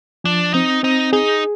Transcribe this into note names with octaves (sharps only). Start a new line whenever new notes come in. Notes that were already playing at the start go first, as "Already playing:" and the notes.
F3 D4
C4 D#4
C4 D#4
D#4 G#4